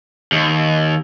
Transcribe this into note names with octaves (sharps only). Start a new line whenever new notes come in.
D#2